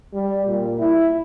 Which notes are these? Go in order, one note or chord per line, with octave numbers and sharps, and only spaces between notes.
G3
A#2
E4